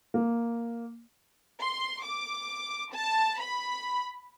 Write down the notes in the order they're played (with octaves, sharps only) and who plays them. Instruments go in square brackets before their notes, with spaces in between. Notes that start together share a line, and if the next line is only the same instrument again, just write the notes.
[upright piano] A#3
[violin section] C6
D6
A5
B5